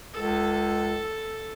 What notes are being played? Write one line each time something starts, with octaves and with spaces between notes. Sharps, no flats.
C#2 A4